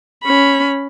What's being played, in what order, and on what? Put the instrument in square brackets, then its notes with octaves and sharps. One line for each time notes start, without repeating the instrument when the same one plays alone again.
[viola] C#4 B5